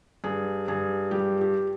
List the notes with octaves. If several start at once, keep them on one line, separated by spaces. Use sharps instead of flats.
G2 G#4
G2 G#4
G3 G4
G4